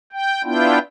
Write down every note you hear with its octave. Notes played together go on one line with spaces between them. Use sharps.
G5
B3 D4 E4 F4 G5